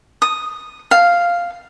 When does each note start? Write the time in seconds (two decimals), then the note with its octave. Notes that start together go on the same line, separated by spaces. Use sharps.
0.22 D#6
0.91 F5